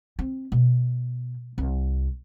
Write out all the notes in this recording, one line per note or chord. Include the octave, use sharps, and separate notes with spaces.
C4
B2
C2